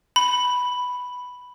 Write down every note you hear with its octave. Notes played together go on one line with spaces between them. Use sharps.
B5